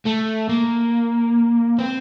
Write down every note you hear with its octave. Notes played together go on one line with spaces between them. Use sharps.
A3
A#3
C4